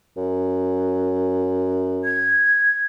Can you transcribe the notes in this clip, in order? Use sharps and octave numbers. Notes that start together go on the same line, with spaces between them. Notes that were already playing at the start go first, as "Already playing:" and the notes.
F#2
G#6